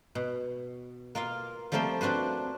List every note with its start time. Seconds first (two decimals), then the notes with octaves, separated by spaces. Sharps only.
0.15 B2
1.15 A#3 F4 A#4 F5
1.72 F3 G3 A3 A#3 C4 C5
2.01 C4 D4 F#4 B4 C5